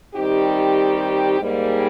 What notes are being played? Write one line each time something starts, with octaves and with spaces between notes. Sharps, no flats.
D#3 G3 C4 D#4 G4
G#2 G3 A#3